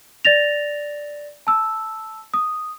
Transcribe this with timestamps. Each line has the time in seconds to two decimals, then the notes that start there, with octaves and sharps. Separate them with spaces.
0.25 D5 A6 A#6 F7
1.47 A5 E6
2.34 D#6